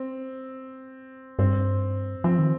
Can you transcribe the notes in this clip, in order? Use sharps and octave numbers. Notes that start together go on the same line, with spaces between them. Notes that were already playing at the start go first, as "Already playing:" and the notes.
Already playing: C4
G2 C4
F3 C4
D#3